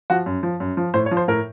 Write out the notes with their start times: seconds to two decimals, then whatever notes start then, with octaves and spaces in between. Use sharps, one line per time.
0.10 F3 F#4
0.26 F#2
0.43 F3
0.60 F#2
0.77 F3
0.94 A2 C5
1.06 C#5
1.11 F3
1.17 C5
1.28 A2 A#4